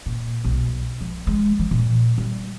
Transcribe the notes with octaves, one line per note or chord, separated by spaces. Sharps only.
A#2
B1
F3
G#3
F3
A#2
G3